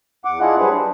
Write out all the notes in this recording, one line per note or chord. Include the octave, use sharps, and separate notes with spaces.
E2 F#5 D6
D4 E4 F4 G#4 D#5 F#5
F#3 G3 D4 G#4 B4 C5
D4